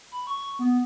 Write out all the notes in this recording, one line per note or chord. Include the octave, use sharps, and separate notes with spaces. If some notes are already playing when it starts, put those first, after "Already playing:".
B5
C#6
B3